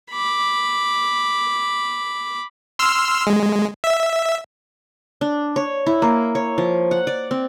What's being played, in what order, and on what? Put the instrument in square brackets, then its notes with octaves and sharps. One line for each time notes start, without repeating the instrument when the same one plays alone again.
[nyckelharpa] B5 D6
[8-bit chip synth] C6 E6 F6
G#3
E5
[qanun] D4
C#5
E4
A#3
C#5
F3
F#5
D5
C4